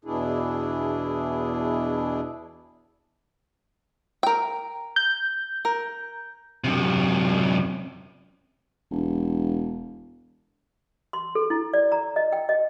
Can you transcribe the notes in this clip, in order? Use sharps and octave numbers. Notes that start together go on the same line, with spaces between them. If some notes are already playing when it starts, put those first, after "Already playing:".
E2 B2 D4 E4 G#4
A#4 G5
G6
A#4
F#2 C3
E1
C6
A4
E4
D5
A#5
D#5
G5
D#5